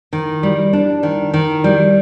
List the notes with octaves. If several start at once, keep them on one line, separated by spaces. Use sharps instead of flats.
D#3
G3
D4
D#3
D#3
G3